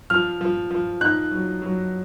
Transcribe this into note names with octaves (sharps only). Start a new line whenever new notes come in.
F3 F6
F3
F3
D#4 F#6
F#3
F#3